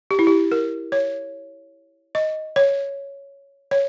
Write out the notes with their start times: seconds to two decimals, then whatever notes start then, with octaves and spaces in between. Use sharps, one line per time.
0.11 G4
0.19 E4
0.27 G4
0.51 A#4
0.92 C#5
2.15 D#5
2.56 C#5
3.71 C#5